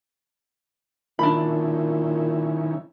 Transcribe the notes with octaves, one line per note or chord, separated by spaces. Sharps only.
A#2 D#3 C#4 D4 E4 B5